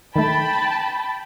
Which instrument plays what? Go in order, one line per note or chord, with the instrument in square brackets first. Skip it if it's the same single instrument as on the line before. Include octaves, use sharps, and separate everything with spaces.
[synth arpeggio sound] D#3 A3 [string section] G5 A5 B5